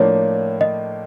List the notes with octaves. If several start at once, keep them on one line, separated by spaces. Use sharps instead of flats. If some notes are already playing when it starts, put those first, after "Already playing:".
Already playing: A2 F3 A#3 D4 C#5
D#5